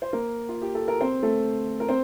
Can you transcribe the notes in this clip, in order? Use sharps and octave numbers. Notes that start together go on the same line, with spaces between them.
C5
A#3 A#4
F4
G4
A4
A#4
C4 C5
A3 A4
A#4
C4 C5